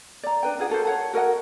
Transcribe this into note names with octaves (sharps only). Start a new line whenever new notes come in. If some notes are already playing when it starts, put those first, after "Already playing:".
D5 A#5
D4 B4 G5
D4 F4 G#4 F#5
F#4 A4 A#4 C5
C#5 F#5 A5
F#4 A#4 D#5 F#5